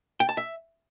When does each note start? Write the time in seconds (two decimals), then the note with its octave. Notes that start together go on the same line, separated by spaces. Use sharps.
0.20 G5
0.29 A5
0.37 E5